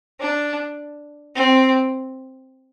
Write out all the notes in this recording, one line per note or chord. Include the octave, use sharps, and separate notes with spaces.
D4
C4